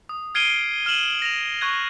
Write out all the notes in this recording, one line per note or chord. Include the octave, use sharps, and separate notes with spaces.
D#6
F6 G#6 C7 D7 D#7 G7
F6 D#7 E7 F#7
A#6 F7
C#6 F#6 G#6